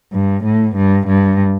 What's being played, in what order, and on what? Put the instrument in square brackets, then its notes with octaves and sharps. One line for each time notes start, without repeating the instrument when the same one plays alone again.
[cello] G2
A2
G2
G2